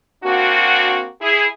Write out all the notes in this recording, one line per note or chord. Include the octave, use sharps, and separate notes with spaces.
A#3 C4 D4 F#4
E4 G#4